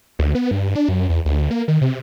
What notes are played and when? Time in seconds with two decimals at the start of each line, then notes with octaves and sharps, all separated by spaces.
0.19 D2
0.35 B3
0.51 G2
0.75 D4
0.89 F#2
1.09 E2
1.25 D2
1.51 A#3
1.68 D#3
1.81 C3